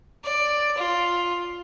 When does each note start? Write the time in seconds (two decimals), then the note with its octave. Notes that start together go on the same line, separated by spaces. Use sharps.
0.24 D5
0.77 F4